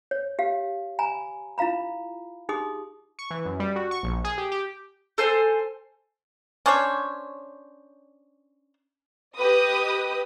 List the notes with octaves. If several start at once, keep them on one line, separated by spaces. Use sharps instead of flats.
C#5
G4 F5
G#5 A#5 B5
E4 F4 F5 A#5 B5
D#4 G4 G#4 C6 D#6
C#6
E3
F#2
G3
F#4
C#6
A#1
G#4
G4
G4
A4 C5 G#5 C6
C#4 D4 C5 C#5
G4 B4 D#5 D#6